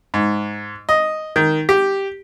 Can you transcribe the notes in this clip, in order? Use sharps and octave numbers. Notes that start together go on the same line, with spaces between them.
G#2
D#5
D#3
G4